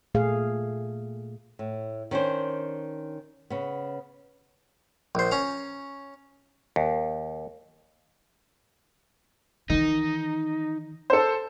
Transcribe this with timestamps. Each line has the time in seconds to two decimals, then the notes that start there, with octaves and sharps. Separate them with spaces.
0.15 A#2 A3 G#4 F5
1.59 A2
2.11 D#3 C#4 D4 C5
3.50 C#3 B3
5.15 A#1 C5
5.32 C#4 A#5
6.76 D#2
9.70 D#3 E3 D#4
11.10 A4 C5